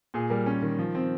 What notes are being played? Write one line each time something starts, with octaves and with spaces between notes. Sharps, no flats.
A#2 G#4
G3 A#4
C#4
D#3
F3
C4